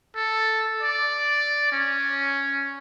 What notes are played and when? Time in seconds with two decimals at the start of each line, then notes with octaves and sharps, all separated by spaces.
0.16 A4
0.82 D5
1.72 C#4